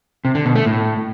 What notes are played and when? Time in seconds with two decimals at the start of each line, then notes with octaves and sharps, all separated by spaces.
0.25 C3
0.35 D3
0.45 B2
0.56 A3
0.66 A2